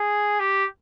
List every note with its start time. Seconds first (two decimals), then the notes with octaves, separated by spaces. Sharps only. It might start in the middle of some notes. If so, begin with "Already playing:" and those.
Already playing: G#4
0.40 G4